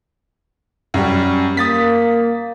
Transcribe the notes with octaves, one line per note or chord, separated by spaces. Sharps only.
F#2 G3 C#4
A#3 D#6 A6 B6